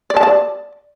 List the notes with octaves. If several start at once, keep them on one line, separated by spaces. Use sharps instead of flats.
D5
A5
D5